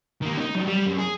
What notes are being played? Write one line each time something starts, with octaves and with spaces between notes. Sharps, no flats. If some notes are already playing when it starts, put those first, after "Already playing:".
D#3 A#3
D4 D#4
F#2 D4
G3
F#2
G#4